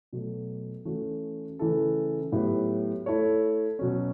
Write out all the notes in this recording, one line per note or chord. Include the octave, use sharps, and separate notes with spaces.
B2 F#3 A3
E3 A3 C#4 F#4
C#3 E3 A3 E4 A4
A2 F#3 B3 E4 G4
A3 E4 A4 C#5
B2 F#3 C#4